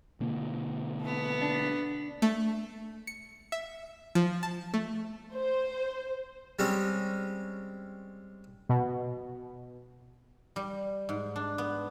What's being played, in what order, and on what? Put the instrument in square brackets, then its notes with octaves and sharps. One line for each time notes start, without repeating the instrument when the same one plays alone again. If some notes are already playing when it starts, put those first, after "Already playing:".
[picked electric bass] B2 D3 A#3
[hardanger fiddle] A3 B3
[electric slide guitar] D4
[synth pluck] A3
C#7
E5
F3
A5
A3
[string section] C5
[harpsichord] G3 G#3 C4 C#4
[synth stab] B2
[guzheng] G3
G#2
D4
B3